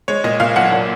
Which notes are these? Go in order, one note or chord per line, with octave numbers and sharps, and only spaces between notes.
G#3 C#5
A#2 D#5
A#2 F5
B1 F#5
A#2